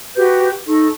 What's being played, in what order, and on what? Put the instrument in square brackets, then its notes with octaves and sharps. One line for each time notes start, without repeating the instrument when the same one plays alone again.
[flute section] F#4 G4 B4 G6
D#4 A4 C#6